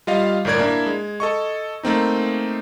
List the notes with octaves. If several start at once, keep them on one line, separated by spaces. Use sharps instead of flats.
G3 F4 D#5 F5
G1 A2 A#4 D5 G#6
A#3 D4 E4
G#3
A4 D#5 C#6
A3 A#3 C4 D#4